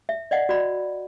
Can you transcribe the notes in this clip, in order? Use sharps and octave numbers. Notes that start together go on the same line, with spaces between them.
E5
D5 D#5 F#5
F#4 D5 B5